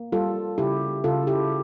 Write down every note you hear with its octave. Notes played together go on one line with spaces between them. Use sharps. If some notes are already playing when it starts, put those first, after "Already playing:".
Already playing: A#3
G3 F4 A4
C#3 E4 G4
C#3 F4 A4
E4 G4